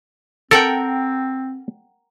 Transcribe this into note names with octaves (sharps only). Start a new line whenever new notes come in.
C4 A4 A#4 F#5 G5